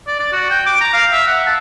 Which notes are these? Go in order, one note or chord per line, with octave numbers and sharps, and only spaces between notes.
D5
D5
F#4
G5
D6
A#5
F5
E5
F#5
A5